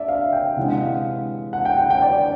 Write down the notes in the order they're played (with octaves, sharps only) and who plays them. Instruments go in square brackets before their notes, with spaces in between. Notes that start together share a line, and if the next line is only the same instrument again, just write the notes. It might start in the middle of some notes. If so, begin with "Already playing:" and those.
Already playing: [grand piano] D3 D5 E5
F5
G5
C3 E3 G#3 F#5
F#5
F5
F#5
G5
G5
G5
D5